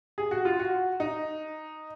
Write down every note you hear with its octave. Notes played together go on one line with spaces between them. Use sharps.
G#4
F#4
F4
F#4
D#4